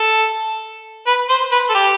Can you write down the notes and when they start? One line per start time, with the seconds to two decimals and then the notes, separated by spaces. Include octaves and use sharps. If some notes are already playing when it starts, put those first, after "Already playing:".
Already playing: A4
1.07 B4
1.29 C5
1.52 B4
1.70 A4
1.75 G4